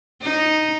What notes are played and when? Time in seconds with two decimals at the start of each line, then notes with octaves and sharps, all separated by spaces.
0.22 D#4